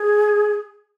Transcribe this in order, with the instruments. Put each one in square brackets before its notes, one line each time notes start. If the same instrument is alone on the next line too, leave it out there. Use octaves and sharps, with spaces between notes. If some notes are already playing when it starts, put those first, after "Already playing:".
Already playing: [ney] G#4